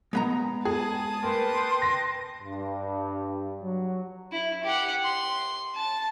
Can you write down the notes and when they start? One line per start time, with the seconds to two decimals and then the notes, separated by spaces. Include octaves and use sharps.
0.13 G#3 B3 A#5
0.65 G#4 A5 D#6
1.23 A#3 B4 G5 C6
1.82 A#6
2.42 G2
3.62 F#3
4.32 E4
4.64 G4 F#5
5.03 C6
5.75 A5